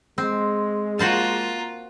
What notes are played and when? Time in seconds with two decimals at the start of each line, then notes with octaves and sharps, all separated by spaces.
0.18 G#3 C4
0.99 A#3 F4 F#4 C5 A5